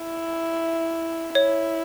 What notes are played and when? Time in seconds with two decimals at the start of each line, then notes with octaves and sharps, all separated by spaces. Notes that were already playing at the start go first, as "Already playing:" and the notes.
Already playing: E4
1.35 E4 C#5